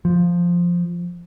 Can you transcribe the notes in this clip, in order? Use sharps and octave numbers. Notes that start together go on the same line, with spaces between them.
F3